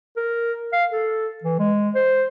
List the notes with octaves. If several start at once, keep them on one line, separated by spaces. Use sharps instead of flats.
A#4
F5
A4
E3
G#3
C5